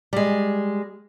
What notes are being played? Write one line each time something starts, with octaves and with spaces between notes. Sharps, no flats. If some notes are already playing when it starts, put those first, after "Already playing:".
G3 G#3